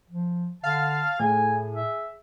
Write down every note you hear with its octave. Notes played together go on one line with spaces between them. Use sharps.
F3
D3 F5 A5
A2 G#4 G#5
E5